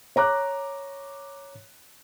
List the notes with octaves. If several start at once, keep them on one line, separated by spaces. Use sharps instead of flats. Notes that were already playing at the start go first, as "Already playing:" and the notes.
C#5 A#5 D6 F#6